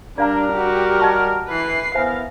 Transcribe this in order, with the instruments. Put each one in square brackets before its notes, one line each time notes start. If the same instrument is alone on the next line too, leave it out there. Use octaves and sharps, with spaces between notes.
[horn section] G3 A#4 [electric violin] D4 [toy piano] D5 F5 A#5
[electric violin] F#4 G4
[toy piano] D#5 A5 C#6
[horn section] E3 [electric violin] B4 C7
[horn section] B3 E4 A#4 [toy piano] C5 E5 G#5 [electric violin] F5